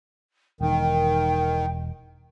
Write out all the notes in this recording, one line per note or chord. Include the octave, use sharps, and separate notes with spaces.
E1 D#3 G5